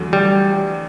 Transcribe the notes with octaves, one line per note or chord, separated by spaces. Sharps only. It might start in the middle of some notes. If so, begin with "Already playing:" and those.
Already playing: E2 D3 F#3 A3
G3